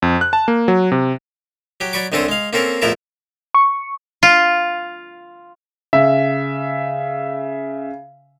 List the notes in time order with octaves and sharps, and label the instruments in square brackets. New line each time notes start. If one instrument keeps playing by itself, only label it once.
[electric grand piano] F2
F#6
A5
A#3
F#3
C3
[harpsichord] F#3 G4
F#3 D5 B5 C#6 D6
C2 D3 C4 C#4 A4 D#6
G#3 F5
A#3 C4 C#4 A4 A#4
A1 E2 F3 E4 A#4 A5
[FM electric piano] C#6
[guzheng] F4
[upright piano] C#3 [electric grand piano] E5